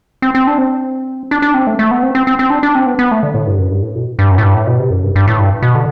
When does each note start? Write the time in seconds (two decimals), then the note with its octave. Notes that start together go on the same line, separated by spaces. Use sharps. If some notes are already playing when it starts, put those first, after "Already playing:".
0.22 C4
0.35 C4
0.47 D4
0.58 C4
1.31 D4
1.42 D4
1.54 C4
1.67 A3
1.79 A3
1.91 B3
2.03 C4
2.15 C4
2.27 C4
2.39 C4
2.50 D4
2.63 D4
2.75 C4
2.87 B3
2.99 B3
3.11 A3
3.23 D3
3.34 A2
3.47 G2
3.59 F#2
3.71 G2
3.83 A2
3.95 B2
4.19 G2
4.31 F#2
4.38 A2
4.43 G2
4.55 A2
4.67 B2
4.79 C3
4.90 F#2
5.03 G2
5.16 G2
5.27 A2
5.39 G2
5.62 B2
5.75 D3